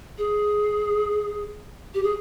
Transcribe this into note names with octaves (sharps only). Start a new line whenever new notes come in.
G#4
G4
G#4